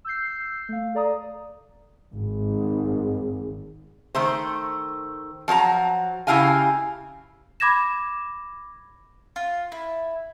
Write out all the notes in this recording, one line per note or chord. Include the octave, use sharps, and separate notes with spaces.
E6 G6 C7
A3 F5
A4 D5 A#5 D#6
G#1
D#3 A3 C5
F3 F#3 C5 A#5
C#3 D#4 E4 G4 F5 G#5
B5 D6 G#6 A#6 E7
F4
E4